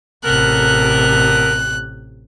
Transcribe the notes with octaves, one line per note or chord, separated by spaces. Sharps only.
A1 C3 B3 A4 A#4 F#6